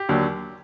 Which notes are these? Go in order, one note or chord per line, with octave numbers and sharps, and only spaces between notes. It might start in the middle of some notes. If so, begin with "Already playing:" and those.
Already playing: G4
D#2 D3 F#3